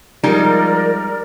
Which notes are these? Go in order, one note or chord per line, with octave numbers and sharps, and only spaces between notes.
F3 G3 G#3 D#4 A#4 D5